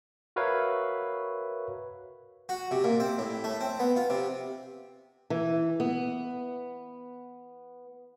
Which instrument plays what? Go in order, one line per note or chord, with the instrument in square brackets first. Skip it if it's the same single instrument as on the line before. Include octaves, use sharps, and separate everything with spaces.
[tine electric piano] F#4 A#4 B4 C#5 E5 F5
[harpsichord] F#4
C3
A#2
C4
A2
A3
C4
B3
F4
C3
[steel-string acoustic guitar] E3
B3